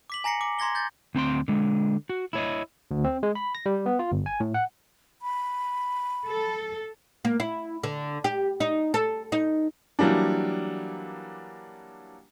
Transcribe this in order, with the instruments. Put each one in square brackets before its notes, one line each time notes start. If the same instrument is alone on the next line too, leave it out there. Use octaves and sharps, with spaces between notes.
[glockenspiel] D6 B6 F#7
G#5 A#5 A#6 C7 C#7
D6
A#5 C6 G#6 A#6 G7
G6 A6
[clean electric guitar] D2 C4 B5 C6
D3 G#3
F#4
E4 C#5 D#5
[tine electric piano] D2
C4
G#3
B5
A#6
G3
B3
F4
G1
G#5
A2
F#5
[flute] B5
[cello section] A4
[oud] A#3
E4
D3
G4
D#4
A4
D#4
[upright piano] E3 F#3 G3 A#3 D4